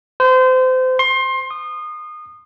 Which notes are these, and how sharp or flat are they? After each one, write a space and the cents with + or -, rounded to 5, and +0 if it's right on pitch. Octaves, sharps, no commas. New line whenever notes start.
C5 -30
C6 +25
D#6 -25